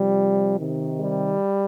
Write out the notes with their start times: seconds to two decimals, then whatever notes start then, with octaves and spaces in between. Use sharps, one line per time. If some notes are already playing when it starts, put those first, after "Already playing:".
Already playing: C3 F3 G3
0.59 C3 D#3
0.99 G3